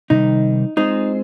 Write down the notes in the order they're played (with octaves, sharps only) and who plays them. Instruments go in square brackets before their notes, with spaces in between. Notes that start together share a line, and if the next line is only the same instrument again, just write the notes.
[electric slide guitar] C3 D#3 G3 [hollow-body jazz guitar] D#4
[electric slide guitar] G#3 C4 F4 G#4 C5 [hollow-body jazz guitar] D#4